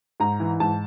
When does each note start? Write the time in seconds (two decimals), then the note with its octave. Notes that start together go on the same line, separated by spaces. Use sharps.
0.20 G#2 A#5
0.40 E3
0.60 G#2 A5